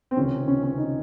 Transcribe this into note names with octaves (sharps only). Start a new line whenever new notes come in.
C4
C#2 C3 D#3 C#4
C#4
C#4
D#4